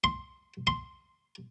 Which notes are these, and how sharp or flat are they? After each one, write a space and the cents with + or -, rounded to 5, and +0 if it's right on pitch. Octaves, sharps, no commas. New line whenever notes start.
C6 +5
C6 +0